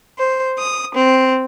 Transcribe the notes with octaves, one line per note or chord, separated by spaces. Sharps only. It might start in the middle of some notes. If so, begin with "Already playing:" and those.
C5
D#6
C4